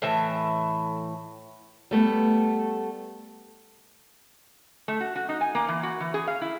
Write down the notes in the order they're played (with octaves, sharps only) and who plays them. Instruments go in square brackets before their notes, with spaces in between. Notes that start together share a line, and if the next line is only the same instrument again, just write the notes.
[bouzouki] A2 E3 E5
[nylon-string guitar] G3 A3 B3
[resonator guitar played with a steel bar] A3
F#4
F#4
D#4
G#5
A#3
E3
F#4
E3
G#4
F5
E4